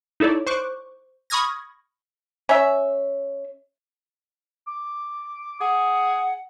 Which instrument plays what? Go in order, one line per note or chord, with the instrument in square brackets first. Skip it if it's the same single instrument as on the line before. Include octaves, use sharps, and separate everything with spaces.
[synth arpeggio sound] D#4 E4 A4 C#5 D5
C5 C#6 D6 F#6
B5 C#6 D#6 F6 G#6 A#6
[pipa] C#4 E5
[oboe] D6
[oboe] G#4 [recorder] F#5